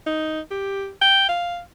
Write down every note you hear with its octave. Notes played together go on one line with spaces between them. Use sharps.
D#4
G4
G5
F5